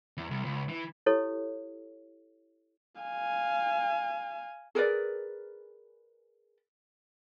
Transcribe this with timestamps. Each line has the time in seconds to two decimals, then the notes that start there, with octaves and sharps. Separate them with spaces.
0.17 E2
0.31 C2
0.45 C#2
0.69 E3
1.06 E4 G4 A4 C#5
3.02 F5 G#5
4.75 G#4 A#4 B4 D5